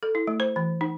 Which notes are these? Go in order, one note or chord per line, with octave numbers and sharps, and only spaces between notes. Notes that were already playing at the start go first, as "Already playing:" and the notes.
A4
E4
A3
C5
E3
D#4